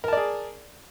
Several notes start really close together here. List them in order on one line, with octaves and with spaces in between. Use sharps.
A#4 A5 D5 G#4